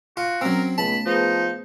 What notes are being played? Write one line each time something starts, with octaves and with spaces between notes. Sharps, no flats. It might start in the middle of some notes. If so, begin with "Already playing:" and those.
F4 F#4
F#3 C4 C#4 A#4
C#2 A3 B3 A5 B5
F3 B3 D#4 G#4 B4